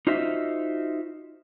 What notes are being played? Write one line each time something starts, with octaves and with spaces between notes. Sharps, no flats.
D#4 F4 F#4 C5 D#5 E5